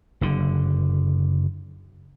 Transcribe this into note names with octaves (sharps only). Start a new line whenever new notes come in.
F#1 D3